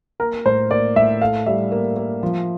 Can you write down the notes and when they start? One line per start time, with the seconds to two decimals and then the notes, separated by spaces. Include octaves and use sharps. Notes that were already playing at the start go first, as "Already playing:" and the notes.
0.20 A#3 A#4
0.45 A2 C5
0.71 A#3 D5
0.96 A2 E5
1.21 A4 F5
1.46 G3 E5
1.72 A#3
1.96 A#3
2.23 F3